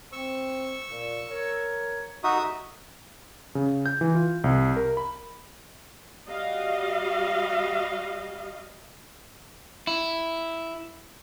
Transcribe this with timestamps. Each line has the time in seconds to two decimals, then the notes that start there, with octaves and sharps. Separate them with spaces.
0.12 C4 C#6 E6
0.90 A#2
1.28 A#4 C#5
2.24 C2 D3 D#4 F#4 E5 D#6
3.55 C#3
3.86 G6
4.01 E3
4.15 F4
4.44 C2
4.76 A#4
4.97 B5
6.27 G3 F#4 D#5 F5
9.87 E4